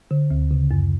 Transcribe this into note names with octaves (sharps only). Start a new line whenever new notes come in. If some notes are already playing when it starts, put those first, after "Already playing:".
D3
D2
C#3
F#2